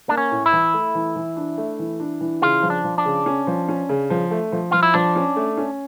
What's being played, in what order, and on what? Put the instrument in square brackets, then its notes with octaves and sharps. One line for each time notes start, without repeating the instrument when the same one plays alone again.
[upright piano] A#3 [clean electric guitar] D4
[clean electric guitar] C#4
[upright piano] A2
[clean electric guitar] E4
[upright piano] E3
A3
E3
E3
D4
A3
E3
D4
E3
[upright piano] C#3 [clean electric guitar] F4
[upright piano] F3
[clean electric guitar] D4
[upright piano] F3
[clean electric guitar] D4
[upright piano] C#3
C#4
F3
C#4
C#3
F3
A3
F3
[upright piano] F3 [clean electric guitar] F4
[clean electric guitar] E4
[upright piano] F3 [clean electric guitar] D4
[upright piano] C#4
A3
C#4